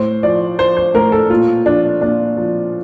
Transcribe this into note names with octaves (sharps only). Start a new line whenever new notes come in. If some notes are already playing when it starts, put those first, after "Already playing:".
Already playing: A2 C5
F3 D5
F3 C5
C5
A2 A#4
A4
A#2 F4
F3 D4
A#2 D4
F3